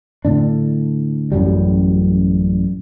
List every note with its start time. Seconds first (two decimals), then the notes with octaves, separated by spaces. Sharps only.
0.25 A2 D3 D4
1.32 A1 F#2 F#3 G3